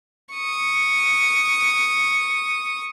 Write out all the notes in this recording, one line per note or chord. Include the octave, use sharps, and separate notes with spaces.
C#6 D#6